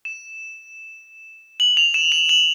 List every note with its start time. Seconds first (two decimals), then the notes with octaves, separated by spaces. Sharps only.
0.05 E7
1.60 F#7
1.77 F7
1.94 E7
2.12 F7
2.29 F#7